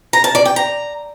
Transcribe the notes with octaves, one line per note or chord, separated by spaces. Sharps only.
A#5
A5
D5
G5
A#5